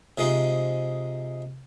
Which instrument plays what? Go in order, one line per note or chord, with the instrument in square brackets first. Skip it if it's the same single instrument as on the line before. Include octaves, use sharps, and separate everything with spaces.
[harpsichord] C3 F3 G#3 D#4